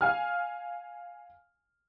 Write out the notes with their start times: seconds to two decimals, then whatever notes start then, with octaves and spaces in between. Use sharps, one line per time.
0.01 F5 G#5 F6